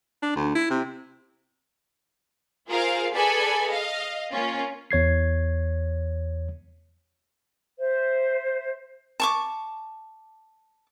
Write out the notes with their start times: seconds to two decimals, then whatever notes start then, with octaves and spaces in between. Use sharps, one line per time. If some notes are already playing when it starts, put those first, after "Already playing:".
0.22 D4
0.36 D2
0.55 E4
0.70 C3
2.68 F4 G#4 A#4 C5 F5
3.13 G#4 A4 B4 D5 G#5 B5
3.71 D#5 F5
4.32 A#3 C#4 F4
4.91 E2 C#5 G#6 C7
7.79 C5 E5
9.20 A5 C#6 D6